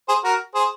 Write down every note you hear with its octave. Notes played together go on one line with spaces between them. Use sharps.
G#4 C5
F#4 A#4
G#4 C5